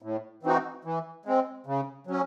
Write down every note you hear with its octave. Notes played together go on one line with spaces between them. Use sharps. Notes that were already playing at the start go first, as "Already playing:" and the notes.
A2
E3 C4 D#4 F#4
E3
G#3 C4
C#3
F#3 C#4